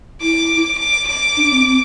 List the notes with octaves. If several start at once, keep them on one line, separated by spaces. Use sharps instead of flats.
E4 D6
D6
D6
D4
C4
C4